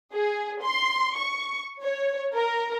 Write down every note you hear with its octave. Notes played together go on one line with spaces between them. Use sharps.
G#4
C6
C#6
C#5
A#4